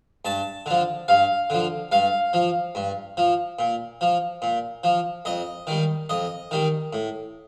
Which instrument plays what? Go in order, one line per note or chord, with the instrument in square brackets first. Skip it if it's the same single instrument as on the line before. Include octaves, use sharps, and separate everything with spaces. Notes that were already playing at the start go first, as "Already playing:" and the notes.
[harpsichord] G2 A5
D3 F3
G2 F5
D3 F3
G2 F5
F3
G2
F3
A#2
F3
A#2
F3
F2 D#5
D#3 G3
F2 D#5
D#3 G3
A2